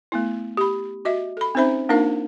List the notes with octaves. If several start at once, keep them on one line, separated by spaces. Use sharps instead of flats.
A3 B3 E4
G4 B5
F#4 D#5 E5
A4 B5
C4 C#4 D#4 C5 E5 B5
A#3 D4 D#4 F4 A#4 F5